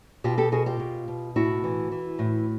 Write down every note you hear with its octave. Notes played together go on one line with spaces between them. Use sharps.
B2 F4 G4
G4 A4
B2 F#4 G#4
F4 G4
B2
B2
A2 E4 F#4
E3
E3
A2